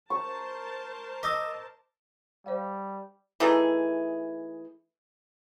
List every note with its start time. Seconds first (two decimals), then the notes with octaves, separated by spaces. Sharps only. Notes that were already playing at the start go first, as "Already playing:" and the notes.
0.10 A#4 C5 A5 C#6
1.23 D#5 D6 E6 A#6
2.46 G3 C5 D5 F5
3.40 E3 A3 D#4 G#4